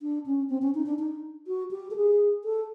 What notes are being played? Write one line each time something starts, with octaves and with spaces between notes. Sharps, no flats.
D4
C#4
C4
C#4
D#4
D4
D#4
F#4
G4
A4
G#4
A4